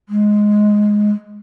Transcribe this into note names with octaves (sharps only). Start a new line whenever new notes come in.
G#3